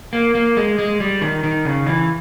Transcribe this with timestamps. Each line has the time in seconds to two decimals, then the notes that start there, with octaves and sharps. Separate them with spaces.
0.13 A#3
0.35 A#3
0.57 G#3
0.79 G#3
1.00 G3
1.21 D#3
1.44 D#3
1.65 C#3
1.87 E3